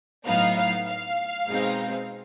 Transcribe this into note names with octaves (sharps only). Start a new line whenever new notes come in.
A2 F#3 B3 D#4 F5
F5
F5
B2 G#3 C4 D#4